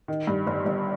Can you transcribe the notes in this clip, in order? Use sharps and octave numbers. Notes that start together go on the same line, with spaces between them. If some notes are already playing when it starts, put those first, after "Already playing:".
D#3
G2
G1
G1